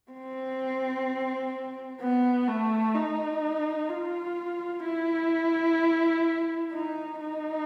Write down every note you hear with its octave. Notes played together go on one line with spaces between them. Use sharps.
C4
B3
A3
D#4
F4
E4
D#4
D#4